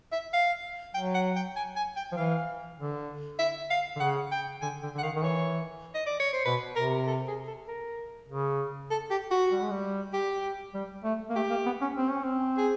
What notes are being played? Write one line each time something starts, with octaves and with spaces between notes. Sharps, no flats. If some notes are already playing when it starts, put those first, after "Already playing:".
E5
F5
F#3 G5
F#5
G5
G#5
G#5
G5
F3
E3 F5
D3
E5
F5
D3
C#3 F#5
G5
D3 G#5
D3 G5
D3
F#5
D#3 F5
D#3
E3 C#5
D#5
D5
C#5
C5
B2 B4
C3 A#4
A4
G#4
A4
A#4
C#3
A4
G4
F#4
G3
G#3
G3
G4
G3
A3
A#3
A3 G4
A#3
B3
C#4
C4
C#4
C4
G#4